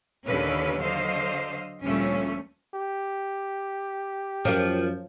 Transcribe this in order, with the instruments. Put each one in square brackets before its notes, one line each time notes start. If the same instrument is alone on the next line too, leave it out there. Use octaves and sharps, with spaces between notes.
[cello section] D#2 A#2 D3 C#4 A#4 B4
D3 F#3 C5 D#5 F5
D2 A#2 F3 G3 A3 C#4
[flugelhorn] G4
[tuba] F#2 [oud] F3 [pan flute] A#4